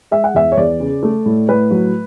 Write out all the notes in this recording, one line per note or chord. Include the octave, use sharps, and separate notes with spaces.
G#3 E5
F#5
E2 E5
C#5
E2 D5
C#3
A3
A2
A2 B4
F#3